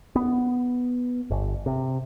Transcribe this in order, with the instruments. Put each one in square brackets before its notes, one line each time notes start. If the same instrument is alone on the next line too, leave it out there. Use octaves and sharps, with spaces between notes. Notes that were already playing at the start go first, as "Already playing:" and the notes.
[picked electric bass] B3
G1
C3